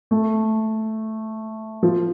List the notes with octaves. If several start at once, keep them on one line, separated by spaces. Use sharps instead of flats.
A3
F3